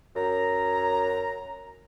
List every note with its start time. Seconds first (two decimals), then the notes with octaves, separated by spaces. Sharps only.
0.16 F#2 A#5